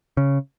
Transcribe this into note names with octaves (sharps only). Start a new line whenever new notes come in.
C#3